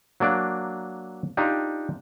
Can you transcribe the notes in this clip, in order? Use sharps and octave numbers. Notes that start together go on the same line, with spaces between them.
F#3 A#3 D4 D5
D4 D#4 F4 G4